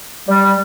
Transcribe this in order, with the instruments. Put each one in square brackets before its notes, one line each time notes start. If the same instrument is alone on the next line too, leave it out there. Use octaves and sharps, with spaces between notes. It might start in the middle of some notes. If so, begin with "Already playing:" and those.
[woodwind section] G3